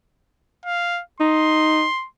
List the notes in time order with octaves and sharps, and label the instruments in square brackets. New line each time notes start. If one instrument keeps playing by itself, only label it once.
[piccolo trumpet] F5
[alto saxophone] D#4 [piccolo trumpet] C6